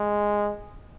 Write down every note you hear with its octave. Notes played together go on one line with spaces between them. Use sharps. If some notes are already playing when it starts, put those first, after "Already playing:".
Already playing: G#3